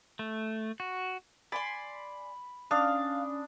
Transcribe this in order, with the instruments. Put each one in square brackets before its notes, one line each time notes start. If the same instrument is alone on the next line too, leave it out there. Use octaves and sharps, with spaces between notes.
[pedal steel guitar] A3
F#4
[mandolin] D5 G#5 C6 [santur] B5
[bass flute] C#4 [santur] D4 [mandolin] F5 [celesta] D#6